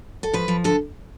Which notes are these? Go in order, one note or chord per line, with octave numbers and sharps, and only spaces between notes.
A4
F3 B4
F3
D3 A4